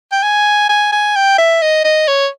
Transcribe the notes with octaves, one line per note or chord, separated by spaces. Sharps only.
G5
G#5
G#5
G#5
G5
E5
D#5
D#5
C#5